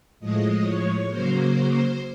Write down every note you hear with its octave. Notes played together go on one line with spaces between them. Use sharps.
A2 F3 G#3 D#5
C#5
C#3 F#3 A#3 C5
C5